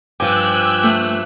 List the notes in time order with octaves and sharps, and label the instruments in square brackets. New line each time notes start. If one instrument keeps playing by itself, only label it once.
[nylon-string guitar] G2 F3 [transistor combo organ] G5 G#5 D6 [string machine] E6 F#6
[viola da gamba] A3